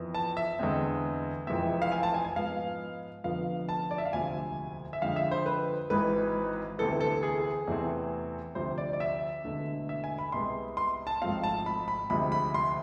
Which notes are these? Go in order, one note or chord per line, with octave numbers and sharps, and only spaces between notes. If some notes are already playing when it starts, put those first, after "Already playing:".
Already playing: F2 E3 B3
A5
E5
E2 D3 G#3 C4
F1 F2 E3 G#3 C4 E5
F5
G#5
A5
G#5
G#5
G#2 F3 B3 F5
F1 F2 D3 F3 B3 F5
A5
D5
E5
F5
E1 D2 C3 F3 G#5
E5
F2 D3 G#3 F5
E5
C5
B4
G#1 G#2 E3 B4
D2 C3 E3 B3 A4
A4
G#4
E2 C3 E3 A3 C4
D2 C3 F3 C5
D5
D5
E5
E1 E2 D3 A3
E5
G#5
B5
C2 C3 G#3 B3 C6
C6
A5
G#1 G#2 F3 A3 C4 F5
A5
B5
B5
D2 C3 F3 G#3 B5
B5
C6